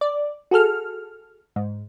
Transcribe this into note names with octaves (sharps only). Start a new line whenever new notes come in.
D5
F#4 G#4 A4 F6
G#2